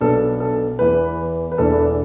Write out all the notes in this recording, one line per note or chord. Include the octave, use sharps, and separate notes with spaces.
B1 B2 B3 D4 A4
A4
E2 E3 B3 B4
B4
E1 E2 E3 D4 A4